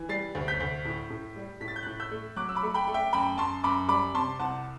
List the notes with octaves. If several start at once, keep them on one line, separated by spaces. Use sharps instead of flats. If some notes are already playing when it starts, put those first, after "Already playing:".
Already playing: E3
G3 A6 C7
D2
G6 B6
D2
A2
A2
G3
A2 B6
A6
G6
A2 F#6 A6
E6 G6
A3
F#3 D6 F#6
E6
B5 D6
A3
G5 B5
A3
E5 G5
F#2 G5 B5
F#2 A5 C6
F#2 B5 D6
G3 B5 D6
C3 A5 C6
C2 F#5 A5